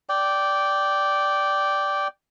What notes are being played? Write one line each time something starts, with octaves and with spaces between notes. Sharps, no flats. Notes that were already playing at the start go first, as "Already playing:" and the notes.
D5 G5